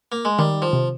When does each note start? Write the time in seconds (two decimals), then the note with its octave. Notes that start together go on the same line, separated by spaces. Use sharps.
0.12 A#3
0.25 G#3
0.39 D#3 G3
0.62 F3
0.73 C3